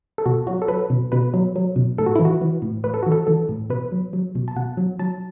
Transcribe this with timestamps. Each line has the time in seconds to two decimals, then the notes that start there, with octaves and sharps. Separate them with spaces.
0.18 A4
0.26 B2 F#4
0.47 F#3 F#4
0.62 A4
0.68 F#3 B4
0.90 B2
1.12 B2 B4
1.34 F#3
1.56 F#3
1.76 B2
1.98 A2 A4
2.06 F#4
2.15 E4
2.19 E3
2.25 F#4
2.41 E3
2.62 A2
2.84 A2 B4
2.94 A4
3.03 E3 F#4
3.12 A4
3.27 E3 A4
3.49 A2
3.70 B2 B4
3.92 F#3
4.13 F#3
4.35 B2
4.48 A5
4.56 B2 F#5
4.77 F#3
4.99 F#3 A5